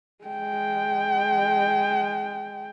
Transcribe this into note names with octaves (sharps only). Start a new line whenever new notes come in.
G#3 G5